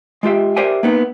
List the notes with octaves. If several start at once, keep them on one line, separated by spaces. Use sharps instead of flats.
G#3 F4 G4 E5
G4 A#4 C5 D5 E5 G#5
A#3 B3 D#4